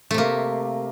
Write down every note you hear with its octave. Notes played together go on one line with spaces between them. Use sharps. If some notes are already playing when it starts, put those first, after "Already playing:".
C3 A3 A#3